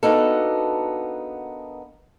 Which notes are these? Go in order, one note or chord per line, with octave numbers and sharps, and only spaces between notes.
A#3 B3 D4 D#4 F#4 A4